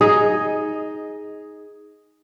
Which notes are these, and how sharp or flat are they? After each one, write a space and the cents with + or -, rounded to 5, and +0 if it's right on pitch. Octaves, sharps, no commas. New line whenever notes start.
D#4 +10 G#4 +0 D#5 +0